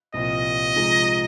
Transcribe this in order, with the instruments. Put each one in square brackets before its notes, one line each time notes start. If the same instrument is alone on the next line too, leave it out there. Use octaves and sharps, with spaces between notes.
[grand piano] C2 A#2 F3 [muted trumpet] D#5
[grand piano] C3 F3 G#3 D#4 G#4